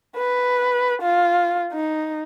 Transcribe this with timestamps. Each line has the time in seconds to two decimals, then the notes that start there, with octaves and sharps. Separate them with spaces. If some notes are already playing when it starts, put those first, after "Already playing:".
0.16 B4
1.02 F4
1.73 D#4